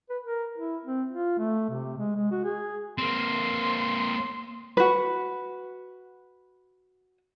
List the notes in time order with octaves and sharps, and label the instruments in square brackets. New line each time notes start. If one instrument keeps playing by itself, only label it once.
[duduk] B4
A#4
E4
C4
F4
A3
C3
G#3
G#3
F#4
G#4
[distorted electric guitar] A#3 C4 [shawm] C6
[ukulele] F#4 B4